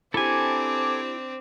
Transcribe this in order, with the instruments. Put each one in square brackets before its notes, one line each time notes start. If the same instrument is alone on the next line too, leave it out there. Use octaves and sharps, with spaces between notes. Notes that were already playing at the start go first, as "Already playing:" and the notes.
[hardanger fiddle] C4 D4 [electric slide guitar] E4 G4 [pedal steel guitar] A4 G#5 [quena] D6